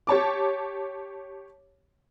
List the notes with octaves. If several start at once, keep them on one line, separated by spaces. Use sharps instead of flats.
G4 C#5 A5 D6